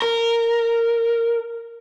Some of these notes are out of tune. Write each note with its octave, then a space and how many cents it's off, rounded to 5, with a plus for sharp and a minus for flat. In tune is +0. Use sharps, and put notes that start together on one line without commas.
A#4 -10